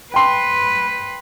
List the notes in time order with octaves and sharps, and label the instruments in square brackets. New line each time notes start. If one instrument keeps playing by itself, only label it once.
[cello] B4 [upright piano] G5 C6